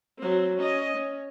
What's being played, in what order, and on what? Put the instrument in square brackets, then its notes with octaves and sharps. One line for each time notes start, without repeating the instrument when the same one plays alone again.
[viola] F#3 C4
C#4 D#5
C#4